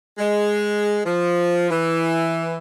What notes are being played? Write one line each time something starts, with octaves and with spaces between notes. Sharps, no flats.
G#3
F3
E3